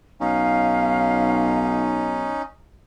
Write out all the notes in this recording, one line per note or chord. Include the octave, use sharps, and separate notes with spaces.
B1 C#4 D#4 F5